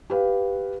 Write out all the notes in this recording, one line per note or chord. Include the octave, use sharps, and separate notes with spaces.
G4 B4 F5